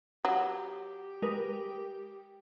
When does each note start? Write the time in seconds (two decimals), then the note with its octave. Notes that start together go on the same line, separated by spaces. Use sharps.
0.25 F#3 G4
1.22 G#3 A#4 B4